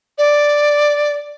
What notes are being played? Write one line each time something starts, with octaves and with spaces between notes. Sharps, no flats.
D5